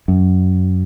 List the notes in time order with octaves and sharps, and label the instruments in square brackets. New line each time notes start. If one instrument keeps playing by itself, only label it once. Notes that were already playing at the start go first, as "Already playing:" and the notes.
[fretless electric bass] F#2